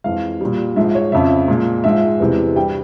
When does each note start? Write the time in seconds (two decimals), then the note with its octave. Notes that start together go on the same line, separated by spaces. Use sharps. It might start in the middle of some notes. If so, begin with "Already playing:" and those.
0.04 F2 E3 G#3 F5
0.41 A#2 G3
0.76 G#2 F3 G#3 E5
0.95 C#5
1.12 F2 C#3 F3 E5
1.48 A#2 G#3
1.84 G#2 F3 G#3 E5
2.20 E2 C3 E3 G#3
2.56 G2 G3 G5